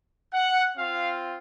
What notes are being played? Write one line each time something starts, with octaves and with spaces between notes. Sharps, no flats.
F#5
C4 F4 F5